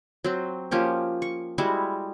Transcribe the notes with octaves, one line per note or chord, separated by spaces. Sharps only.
F#3 C4
F3 A#3 C#4 G4
C#6
G3 G#3 E4 F#4